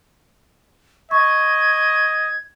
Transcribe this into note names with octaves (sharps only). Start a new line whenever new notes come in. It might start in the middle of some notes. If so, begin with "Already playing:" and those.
D#5 C#6 G#6